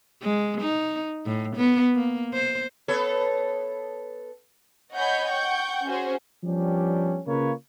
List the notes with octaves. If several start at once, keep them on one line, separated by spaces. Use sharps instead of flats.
G#3
D#4
A2
B3
A#3
C5
B3 A4 C#5
C#5 D#5 F#5 G#5 B5 G6
F#5 G5 C#6 G6
C#4 F#4 G#4 C5
F3 G3 B3 C#4 D4 G4
C#3 A#3 F4 A#4 B4 C#5